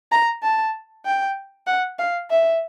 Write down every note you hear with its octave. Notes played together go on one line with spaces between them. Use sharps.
A#5
A5
G5
F#5
F5
E5